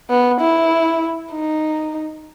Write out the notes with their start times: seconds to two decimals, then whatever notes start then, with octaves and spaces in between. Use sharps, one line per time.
0.10 B3
0.41 E4
1.33 D#4